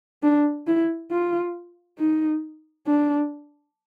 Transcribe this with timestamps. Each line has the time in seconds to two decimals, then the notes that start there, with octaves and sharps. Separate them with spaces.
0.23 D4
0.67 E4
1.11 F4
1.99 D#4
2.87 D4